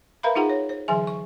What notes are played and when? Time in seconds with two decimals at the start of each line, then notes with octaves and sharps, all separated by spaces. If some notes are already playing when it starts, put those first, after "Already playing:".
0.23 A#4 B4 E5 F5 A#5 B5
0.35 D#4 F4 G#4 F#5 A#5
0.49 C#5
0.69 C5
0.88 D3 E3 F#3 G#4 E5 G#5
1.07 C#6